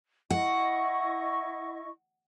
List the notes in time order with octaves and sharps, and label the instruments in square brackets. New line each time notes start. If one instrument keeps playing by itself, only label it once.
[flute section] E4 D#5 C#6 [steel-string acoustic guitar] F#5